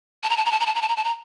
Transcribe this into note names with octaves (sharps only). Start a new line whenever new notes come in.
A5
A#5
A5
A#5
A5
A#5
A5
A#5
A5
A#5
A5
A#5